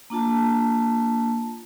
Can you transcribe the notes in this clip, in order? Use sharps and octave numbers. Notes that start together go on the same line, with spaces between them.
A#3 D4 F4 A5